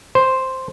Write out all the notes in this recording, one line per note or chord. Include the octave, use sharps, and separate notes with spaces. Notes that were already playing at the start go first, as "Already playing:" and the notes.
C5